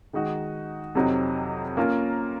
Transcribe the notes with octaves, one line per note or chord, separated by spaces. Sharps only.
D#3 G#3 D#4 F#4
F2 C3 F#3 C4 D#4
A#3 C#4 F4 A#4